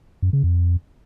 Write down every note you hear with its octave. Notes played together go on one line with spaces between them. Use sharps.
F#2
C#3
F2